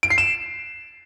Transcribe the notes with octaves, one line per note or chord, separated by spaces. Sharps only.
D7
C7
E7